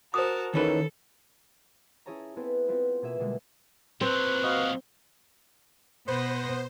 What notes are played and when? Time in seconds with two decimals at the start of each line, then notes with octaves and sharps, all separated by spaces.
0.14 F#4 A#4 C5 A5 D#6
0.54 D#3 E3 C#4 A4 B4
2.06 C#4 E4 G#4 C#5 A5 A#5
2.36 B3 C4 E4 G#4 A4 B4
2.68 B3 C4 F4 B4
3.02 B2 A#3 G#4 E5 E7
3.19 B2 D3 G3 G#3 A#3 B3
4.01 A#2 F#3 C4 B4
4.43 F#4 D#5 F5
6.08 B2 B3 B4 C5 A#6